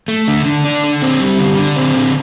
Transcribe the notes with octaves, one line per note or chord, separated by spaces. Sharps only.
A3
D3
D3
D4
D3
C4
G3
D3
D3
C4
D3